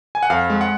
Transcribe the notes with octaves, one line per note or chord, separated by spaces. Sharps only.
G#5
F#5
F2 F5
G#3
F#5